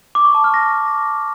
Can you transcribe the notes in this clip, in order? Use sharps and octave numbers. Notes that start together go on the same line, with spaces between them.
D6
C#6
A5
F6
A#6